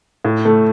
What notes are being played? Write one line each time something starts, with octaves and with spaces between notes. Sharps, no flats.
A2
A3